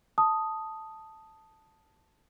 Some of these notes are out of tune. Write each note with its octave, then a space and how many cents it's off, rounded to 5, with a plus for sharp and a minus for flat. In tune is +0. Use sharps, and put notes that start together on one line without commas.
A5 +0 D#6 +0